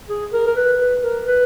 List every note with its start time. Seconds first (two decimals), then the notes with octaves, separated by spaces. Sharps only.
0.09 G#4
0.33 A#4
0.47 A#4
0.56 B4
0.80 B4
1.03 A#4
1.26 B4